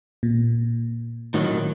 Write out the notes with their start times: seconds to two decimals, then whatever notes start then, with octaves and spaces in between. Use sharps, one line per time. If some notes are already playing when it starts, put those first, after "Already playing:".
0.23 A#2
1.34 A2 D#3 F#3